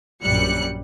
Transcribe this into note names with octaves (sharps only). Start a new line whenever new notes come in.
A#1 F#2 G3 F#6 C#7